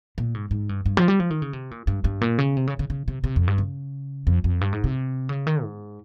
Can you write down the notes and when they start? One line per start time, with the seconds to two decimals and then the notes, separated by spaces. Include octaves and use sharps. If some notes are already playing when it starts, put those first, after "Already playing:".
0.18 A#2
0.34 G#2
0.51 G#2
0.69 G2
0.86 G2
0.97 F3
1.08 G3
1.20 F3
1.30 D#3
1.42 C#3
1.53 C3
1.71 A#2
1.87 G2
2.04 G2
2.21 A#2
2.38 C#3
2.57 C3
2.67 C#3
2.79 C#3
2.90 C#3
3.08 C3
3.24 C3
3.36 F2
3.48 G2
3.58 C#3
4.27 F2
4.44 F2
4.61 G2
4.73 G#2
4.84 C3
5.29 C#3
5.47 D#3
5.63 G#2